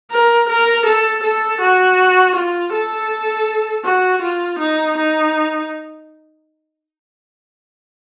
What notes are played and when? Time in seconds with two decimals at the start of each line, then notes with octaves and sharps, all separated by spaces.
0.11 A#4
0.49 A#4
0.85 A4
1.23 A4
1.60 F#4
2.35 F4
2.72 A4
3.85 F#4
4.22 F4
4.59 D#4
4.97 D#4